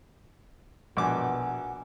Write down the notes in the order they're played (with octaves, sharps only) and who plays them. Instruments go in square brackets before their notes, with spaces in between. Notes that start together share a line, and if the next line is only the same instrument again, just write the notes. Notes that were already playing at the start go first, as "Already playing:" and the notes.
[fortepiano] A#1 D6 [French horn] B2 [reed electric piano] F#5 G#5